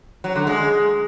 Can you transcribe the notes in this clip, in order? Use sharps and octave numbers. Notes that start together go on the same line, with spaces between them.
F#3
D3
G#3